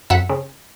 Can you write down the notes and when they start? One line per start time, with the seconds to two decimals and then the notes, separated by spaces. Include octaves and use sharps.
0.10 F#2 E5 F#5
0.29 C#3